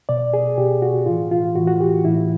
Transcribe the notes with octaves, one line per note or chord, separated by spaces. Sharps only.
B2 D5
G#4
B2 G4
F#4
A2 E3 F4
F4
A2 E3 F#4
F#4
G4
A2 E3 E4